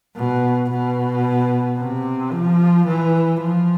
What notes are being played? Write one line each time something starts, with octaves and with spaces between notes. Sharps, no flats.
B2
B2
C3
F3
E3
F3